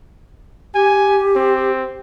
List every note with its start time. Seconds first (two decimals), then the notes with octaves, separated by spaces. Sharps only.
0.75 G4 G#5
1.36 C4